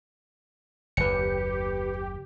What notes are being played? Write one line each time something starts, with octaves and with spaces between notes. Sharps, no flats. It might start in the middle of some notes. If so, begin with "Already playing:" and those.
F#1 D#2 G4 B4 C#7